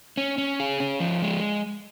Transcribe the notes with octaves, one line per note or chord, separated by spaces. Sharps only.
C#4
C#4
G#4
C#4
F3
G#3